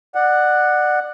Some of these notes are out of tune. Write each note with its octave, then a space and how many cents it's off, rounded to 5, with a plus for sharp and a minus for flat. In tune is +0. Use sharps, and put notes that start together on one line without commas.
D5 +25 F#5 +0